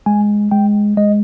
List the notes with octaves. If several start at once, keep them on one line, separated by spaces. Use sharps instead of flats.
G#3 G#5
G#3 G5
G#3 D#5